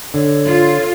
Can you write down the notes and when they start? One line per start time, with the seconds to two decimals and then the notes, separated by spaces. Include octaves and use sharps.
0.14 D3 A4 C#5
0.45 F4